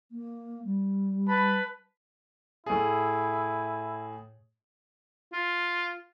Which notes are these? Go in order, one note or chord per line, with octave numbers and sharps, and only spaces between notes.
A#3
G3
B4 A5 B5
A2 E4 G#4
F4